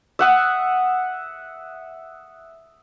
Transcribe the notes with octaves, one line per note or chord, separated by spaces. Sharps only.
E5 F#5 D#6